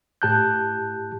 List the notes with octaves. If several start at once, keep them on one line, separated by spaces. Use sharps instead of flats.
A2 G4 A5 F#6 G6